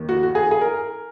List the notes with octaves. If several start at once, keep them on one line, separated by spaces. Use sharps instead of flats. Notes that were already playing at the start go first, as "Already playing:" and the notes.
Already playing: D#2 D#3
F#4
F#4
G#4
G#4
A#4